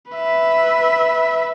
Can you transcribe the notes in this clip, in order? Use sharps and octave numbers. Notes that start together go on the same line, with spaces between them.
B4 E5